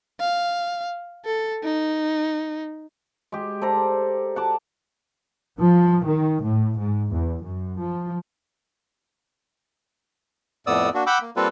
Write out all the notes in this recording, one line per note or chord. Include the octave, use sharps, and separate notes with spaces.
F5
A4
D#4
G#3 G4
A4 C5 D5 A#5
F#5 A5 D6
F3
D#3
A2
G#2
E2
F#2
F3
F2 A2 B3 D5 D#6 E6
A#3 D4 F#4
F#5 G5 B5 D6 E6
A#3
G3 A#3 C4 F4 A4 B4